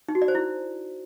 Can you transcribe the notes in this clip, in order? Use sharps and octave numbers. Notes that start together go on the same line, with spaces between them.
D#4
F#4
D5
C5
E4